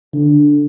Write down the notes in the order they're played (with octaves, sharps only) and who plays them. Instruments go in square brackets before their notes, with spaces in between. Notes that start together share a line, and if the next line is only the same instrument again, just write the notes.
[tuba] D3